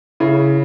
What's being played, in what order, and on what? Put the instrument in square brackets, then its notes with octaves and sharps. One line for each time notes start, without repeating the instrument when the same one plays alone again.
[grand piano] C#3 [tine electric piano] E4